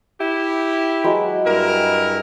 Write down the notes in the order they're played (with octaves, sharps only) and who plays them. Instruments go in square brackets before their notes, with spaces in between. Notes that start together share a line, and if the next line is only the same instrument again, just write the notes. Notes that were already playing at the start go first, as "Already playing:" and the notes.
[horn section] E4 G4
[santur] F#3 G#3 B4
[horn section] G2 E4 A#4